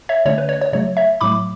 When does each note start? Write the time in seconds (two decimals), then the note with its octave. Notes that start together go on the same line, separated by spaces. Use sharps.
0.09 C#5 E5
0.25 D3 A3 C#4 C#5
0.38 B4
0.49 C#5
0.61 C#5
0.73 C#3 F#3 A3 C#5
0.97 C#5 E5
1.21 A2 F#3 A3 B5 D6